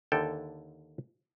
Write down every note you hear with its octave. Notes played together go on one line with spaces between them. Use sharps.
D#2 D3 A4 G5